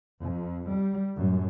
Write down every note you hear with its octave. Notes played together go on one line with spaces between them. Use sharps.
F2
G3
F#2 A2